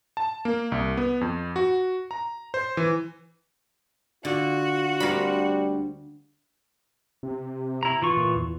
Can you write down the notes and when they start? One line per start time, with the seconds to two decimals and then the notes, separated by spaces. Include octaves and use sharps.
0.17 A5
0.45 A#3
0.72 C2
0.97 B3
1.21 F2
1.56 F#4
2.11 A#5
2.54 C5
2.77 E3
4.25 D3 F4 F#4
5.00 D2 G3 C4 A#4 F5 B5
7.23 C3
7.83 E4 A#5
8.02 E3 F4 C#6
8.17 A#2
8.36 E2